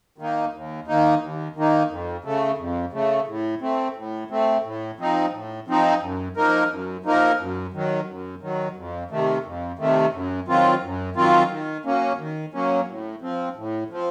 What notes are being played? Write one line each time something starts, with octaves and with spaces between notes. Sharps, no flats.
D#3 A#3 D#4
D#2
D#3 A#3 D#4
D#2
D#3 A#3 D#4
F2
C#3 A3
F2
C#3 A3
A2
A3 C4
A2
A3 C4
A2
F3 C4 D#4
A2
F3 C4 D#4
F#2
F3 A#3 D#4 A#4
F#2
F3 A#3 D#4 A#4
F#2
D#3 F#3
F#2
D#3 F#3
F2
C3 D#3 A3
F2
C3 D#3 A3
F#2
D#3 F#3 C4 F4
F#2
D#3 F#3 C4 F4
D#3
F#3 A#3 C#4
D#3
F#3 A#3 C#4
A2
F3 C4
A2
F3 C4